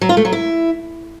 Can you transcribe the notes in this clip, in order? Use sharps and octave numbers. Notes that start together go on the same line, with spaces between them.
F#3
F4
A3
F#3
E4